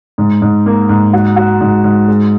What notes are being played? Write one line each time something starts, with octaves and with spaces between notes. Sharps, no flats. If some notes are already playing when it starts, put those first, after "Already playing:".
G#2
G#2
A#3
G#2
F#4
F#4
G#2
G#2
G#3